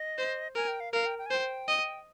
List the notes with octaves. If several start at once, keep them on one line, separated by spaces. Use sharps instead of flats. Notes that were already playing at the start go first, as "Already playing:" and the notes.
Already playing: D#5
C5
A#4 G#5
G5
F5
A#4 F5
G5
G5
G#5
C5 G5
D#5